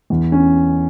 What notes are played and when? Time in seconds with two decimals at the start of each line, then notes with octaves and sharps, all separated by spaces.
0.10 E2
0.32 C#4